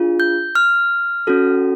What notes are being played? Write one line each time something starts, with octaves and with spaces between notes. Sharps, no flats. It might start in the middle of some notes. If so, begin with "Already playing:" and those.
Already playing: D4 F4 G#4
G6
F6
C#4 F#4 A4